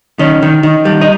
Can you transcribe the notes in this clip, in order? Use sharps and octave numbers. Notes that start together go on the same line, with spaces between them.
D#3 C#4
D#3
D#3
G3
D#4